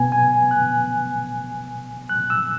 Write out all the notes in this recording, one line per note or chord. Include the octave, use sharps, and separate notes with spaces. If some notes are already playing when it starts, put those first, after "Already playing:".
Already playing: B2 B3 G#5
G#5
F#6
F#6
E6